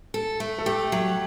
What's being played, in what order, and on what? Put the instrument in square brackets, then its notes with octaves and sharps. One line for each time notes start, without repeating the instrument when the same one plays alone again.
[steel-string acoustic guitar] A4
A3
[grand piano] A4
[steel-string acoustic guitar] A3 [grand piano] G4
[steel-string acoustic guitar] F#3